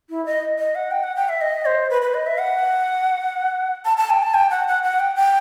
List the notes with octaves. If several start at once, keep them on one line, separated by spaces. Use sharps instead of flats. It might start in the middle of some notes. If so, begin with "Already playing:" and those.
E4
D#5
D#5
F#5
G5
F#5
G5
E5
D#5
C5
B4
B4
D#5
E5
F#5
A5
A5
G5
A5
G5
F#5
F#5
F#5
G5
G5